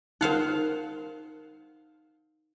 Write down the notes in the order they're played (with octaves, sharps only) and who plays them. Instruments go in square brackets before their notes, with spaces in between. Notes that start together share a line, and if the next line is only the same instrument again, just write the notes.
[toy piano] D#4 A#4 [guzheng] C5 F5 F#5